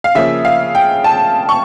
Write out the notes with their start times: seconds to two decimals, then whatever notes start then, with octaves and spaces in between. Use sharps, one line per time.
0.04 F5
0.15 C#3 F3 A#3 C#4 E5
0.45 F5
0.75 G5
1.04 A5
1.49 C#6